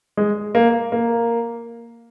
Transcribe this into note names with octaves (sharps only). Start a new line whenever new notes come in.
G#3
A#3
A#3